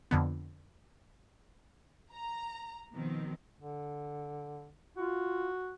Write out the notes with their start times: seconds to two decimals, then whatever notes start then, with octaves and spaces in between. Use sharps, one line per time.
0.11 F2 D3 B3
2.12 A#5
2.93 B2 D#3 F3 C4
3.60 D3
4.97 F4 F#4